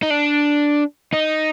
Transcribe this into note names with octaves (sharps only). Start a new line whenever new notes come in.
D#4
D4
D#4